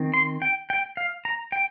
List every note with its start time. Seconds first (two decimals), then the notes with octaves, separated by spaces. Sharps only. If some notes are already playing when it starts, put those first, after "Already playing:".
Already playing: D#3 C4
0.14 C6
0.42 G5
0.70 G5
0.97 F5
1.25 A#5
1.52 G5